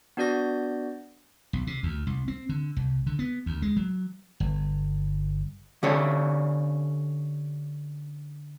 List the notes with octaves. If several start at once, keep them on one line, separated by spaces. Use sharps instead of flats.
B3 D4 F#4 D5 G6 A#6
B1
C3
D2
C2
C4
D3
C2
D3
B3
D2
G#3
F#3
G1
D3 C#4 G4 A4 C#5